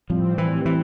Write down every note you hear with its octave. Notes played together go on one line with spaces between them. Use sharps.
A2 F3 G3 C4
E3
E3